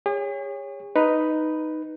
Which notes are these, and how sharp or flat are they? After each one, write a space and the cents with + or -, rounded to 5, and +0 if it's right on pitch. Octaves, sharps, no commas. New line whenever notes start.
G#4 -45 C#5 +0
D#4 +0 B4 +0